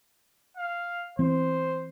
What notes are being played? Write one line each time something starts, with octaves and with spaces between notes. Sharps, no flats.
F5
E3 B3 C4 C5